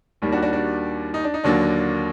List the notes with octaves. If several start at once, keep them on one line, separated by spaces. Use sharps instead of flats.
D#2 D#3 G3 A#3
D4 F#4
D4 F#4
D4 F#4
D#4
D4
D#4
D#2 D3 F#3 A#3 D4